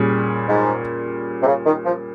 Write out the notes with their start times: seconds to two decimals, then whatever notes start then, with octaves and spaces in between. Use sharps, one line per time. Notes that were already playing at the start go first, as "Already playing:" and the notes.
Already playing: A#2 G3 C#4 G#4
0.48 G#2
1.42 C3
1.46 C#3
1.65 D#3
1.85 F3